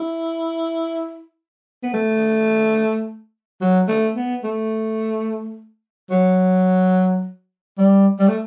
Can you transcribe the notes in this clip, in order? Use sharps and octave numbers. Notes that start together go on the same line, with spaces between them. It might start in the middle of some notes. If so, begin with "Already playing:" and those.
Already playing: E4
B3
A3
F#3
A3
B3
A3
F#3
G3
G3
A3